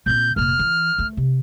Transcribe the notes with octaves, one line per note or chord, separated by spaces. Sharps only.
A#2 C4 G6
F1 A#2 F6
E3
A3
C3